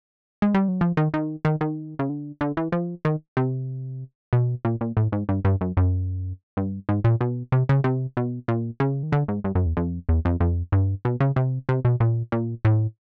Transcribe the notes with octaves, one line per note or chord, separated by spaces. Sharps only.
G#3
G3
F#3
F3
D#3
D#3
D#3
D#3
C#3
D3
D3
E3
F3
D#3
C3
B2
A#2
A#2
A2
G#2
G2
G2
F#2
F#2
G2
G#2
A#2
B2
C3
C#3
C3
B2
A#2
C#3
D#3
D3
G#2
G2
F#2
E2
F2
E2
F2
F2
G2
B2
C#3
C3
C3
B2
A#2
A#2
A2